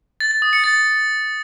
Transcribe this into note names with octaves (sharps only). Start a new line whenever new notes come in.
A6
A6
D#6
C#7
A6